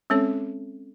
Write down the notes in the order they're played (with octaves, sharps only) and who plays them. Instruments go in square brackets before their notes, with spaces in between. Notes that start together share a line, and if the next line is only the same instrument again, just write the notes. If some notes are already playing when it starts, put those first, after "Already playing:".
[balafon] G#3 C4 C#4 A4 C#5